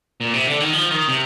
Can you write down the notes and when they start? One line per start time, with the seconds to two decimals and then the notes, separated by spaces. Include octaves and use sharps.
0.21 A#2
0.34 C3
0.47 D3
0.60 D#3
0.73 F3
0.91 D#3
1.08 C3